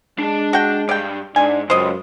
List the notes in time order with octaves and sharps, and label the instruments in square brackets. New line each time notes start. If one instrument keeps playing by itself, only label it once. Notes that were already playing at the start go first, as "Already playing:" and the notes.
[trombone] G#3 [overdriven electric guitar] D4 A5
[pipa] F#4 G5
[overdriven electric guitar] G2 [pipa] D5 G5
[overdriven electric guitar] G#2 [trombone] D4 [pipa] G#5
[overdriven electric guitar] C#2 [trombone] F#2 [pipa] C5 D#5